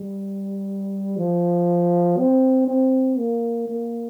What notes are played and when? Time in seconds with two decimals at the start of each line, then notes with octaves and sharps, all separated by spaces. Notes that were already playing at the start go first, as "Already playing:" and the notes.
Already playing: G3
1.18 F3
2.18 C4
2.68 C4
3.17 A#3
3.68 A#3